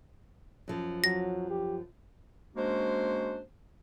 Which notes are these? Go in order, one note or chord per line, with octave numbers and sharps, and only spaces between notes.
F#2 F3
F#3 A#6
G4
G#3 A#3 C#4 D4 F#4 C5